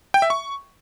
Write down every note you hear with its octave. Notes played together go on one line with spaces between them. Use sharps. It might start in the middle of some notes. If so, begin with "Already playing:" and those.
G5
E5
C#6